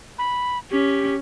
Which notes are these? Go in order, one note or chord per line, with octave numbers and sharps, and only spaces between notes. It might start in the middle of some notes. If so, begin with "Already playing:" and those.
B5
C#4 G4